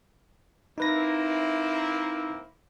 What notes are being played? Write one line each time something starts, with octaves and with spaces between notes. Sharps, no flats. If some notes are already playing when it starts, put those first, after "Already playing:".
A#3 C4 D#4 E4 B4 A#6